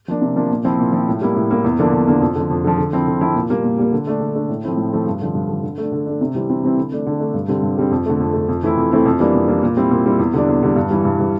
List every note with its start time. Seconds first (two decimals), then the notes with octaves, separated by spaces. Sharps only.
0.08 F3 A#3 D4
0.21 C3
0.36 F3 A#3 D4
0.51 A#2
0.64 F3 C4 E4
0.79 A#2
0.93 F3 C4 E4
1.08 A2
1.21 G3 A#3 E4
1.36 A2
1.50 G3 A#3 E4
1.64 E2
1.79 D3 F3 A#3 D4
1.93 E2
2.07 D3 F3 A#3 D4
2.21 F2
2.35 D3 F3
2.50 F2
2.64 D3 F3
2.78 D3
2.93 F3 C4 E4
3.07 D3
3.21 F3 C4 E4
3.35 A#2
3.50 G3 A#3
3.64 A#2
3.78 G3 A#3
3.93 D3
4.07 A3 D4
4.20 D3
4.36 A3 D4
4.49 A2
4.63 F3 A3 C4 E4
4.77 A2
4.92 F3 A3 C4 E4
5.07 G2
5.21 D3 F3
5.35 G2
5.49 D3 F3
5.63 D3
5.78 A3 D4
5.92 D3
6.06 A3 D4
6.21 C3
6.35 E3 G3 C4 E4
6.49 C3
6.64 E3 G3 C4 E4
6.77 D3
6.92 A3 D4
7.06 D3
7.20 A3 D4
7.34 G2
7.48 D3 G3 C4
7.63 G2
7.77 D3 G3 C4
7.91 F2
8.06 D3 A3
8.20 F2
8.34 D3 A3
8.49 F2
8.63 E3 A3 C4 E4
8.77 F2
8.91 E3 A3 C4 E4
9.06 F2
9.19 E3 G3 A#3 D4
9.35 F2
9.48 E3 G3 A#3 D4
9.63 A#2
9.77 G3 C4 E4
9.91 A#2
10.05 G3 C4 E4
10.19 E2
10.34 D3 G3 D4
10.48 E2
10.63 D3 G3 D4
10.76 G2
10.90 E3 G3
11.05 G2
11.19 E3 G3